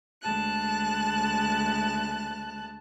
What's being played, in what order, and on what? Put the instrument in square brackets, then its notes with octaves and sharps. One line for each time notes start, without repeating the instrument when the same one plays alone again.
[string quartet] D2 G#3 A5 F#6